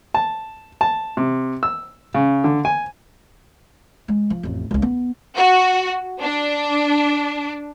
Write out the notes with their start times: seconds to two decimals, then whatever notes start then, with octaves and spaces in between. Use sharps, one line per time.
0.14 A5
0.81 A5
1.17 C3
1.63 E6
2.14 C#3
2.44 D3
2.65 G#5
4.08 G#3
4.30 F3
4.43 A1 F2
4.71 D1 C#2
4.82 B3
5.35 F#4
6.21 D4